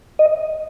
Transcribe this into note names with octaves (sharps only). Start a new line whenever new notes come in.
D#5